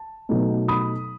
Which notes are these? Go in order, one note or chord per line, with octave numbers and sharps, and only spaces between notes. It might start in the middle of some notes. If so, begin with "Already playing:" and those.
Already playing: A5
B2 F#3 A3 D#4
B5 D#6